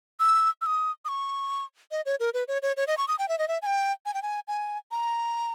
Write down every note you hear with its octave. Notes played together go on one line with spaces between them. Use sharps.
E6
E6
D#6
D#6
C#6
D#5
C#5
A#4
B4
C#5
C#5
C#5
D#5
C#6
D#6
G5
E5
D#5
E5
G#5
G5
G#5
G5
G#5
G#5
A#5